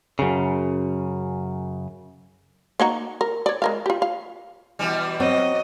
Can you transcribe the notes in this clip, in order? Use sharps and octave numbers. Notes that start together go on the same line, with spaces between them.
F#2 C#3
A#3 D#4 F#4
A#4
C#5 D5
G#3 A#4 F5
F4 G4
F5
B2 E3 G3
F#3 C4 D#5